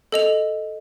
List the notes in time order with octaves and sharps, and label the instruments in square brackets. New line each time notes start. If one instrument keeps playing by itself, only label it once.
[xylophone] A4 D#5 F7